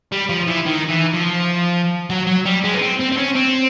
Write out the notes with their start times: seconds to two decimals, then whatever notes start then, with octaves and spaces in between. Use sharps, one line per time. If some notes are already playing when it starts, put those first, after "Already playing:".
0.12 G3
0.29 F3
0.47 E3
0.65 D#3
0.89 E3
1.14 F3
2.10 F#3
2.27 F#3
2.46 G3
2.64 G#3
2.74 B3
2.82 C4
3.00 C4
3.12 C4
3.17 C#4
3.35 C4